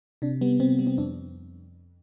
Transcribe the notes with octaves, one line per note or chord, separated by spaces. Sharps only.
C3 D4
G3 B3
C3 C4
G3
C4
F2 D4